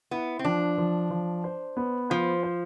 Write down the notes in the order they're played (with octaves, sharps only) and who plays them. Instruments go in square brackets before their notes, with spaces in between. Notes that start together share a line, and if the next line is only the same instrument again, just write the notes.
[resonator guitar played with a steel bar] B3 [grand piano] E4
[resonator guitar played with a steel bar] C4
[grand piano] F3 [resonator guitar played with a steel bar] D4
[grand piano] F3
F3
C5
B3
[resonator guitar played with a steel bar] F3 [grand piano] C5
[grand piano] C5